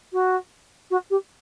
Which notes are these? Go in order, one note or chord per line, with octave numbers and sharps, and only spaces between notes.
F#4
F#4
G4